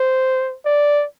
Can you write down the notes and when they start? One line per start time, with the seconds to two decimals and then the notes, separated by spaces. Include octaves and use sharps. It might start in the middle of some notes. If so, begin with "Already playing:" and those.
Already playing: C5
0.65 D5